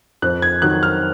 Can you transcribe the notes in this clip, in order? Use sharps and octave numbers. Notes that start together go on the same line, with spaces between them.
F2 F#6
G#6
D#3 F#3 F#6
F6